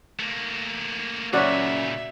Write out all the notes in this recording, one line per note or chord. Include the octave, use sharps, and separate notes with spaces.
A3 A#3
F#2 A#2 C#3 C#4 F#4 D5 E5 F#5